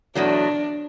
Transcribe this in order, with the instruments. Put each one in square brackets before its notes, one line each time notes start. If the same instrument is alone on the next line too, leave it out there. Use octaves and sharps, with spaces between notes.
[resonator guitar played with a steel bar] E2 B2 F#3 A3 [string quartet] D4